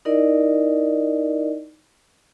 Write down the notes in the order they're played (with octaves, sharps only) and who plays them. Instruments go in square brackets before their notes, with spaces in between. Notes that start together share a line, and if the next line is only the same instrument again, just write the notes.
[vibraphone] D#4 E4 A#4 D5 D#5